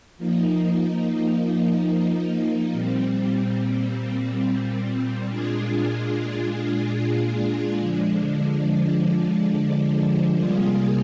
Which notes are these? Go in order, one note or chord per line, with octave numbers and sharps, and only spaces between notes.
F3 A#3 D#4
A#2 G3 C4
A#2 G#3 D4 F4 G#4
D3 F3 G#3 D4
C3 G3 A#3 F4 G#4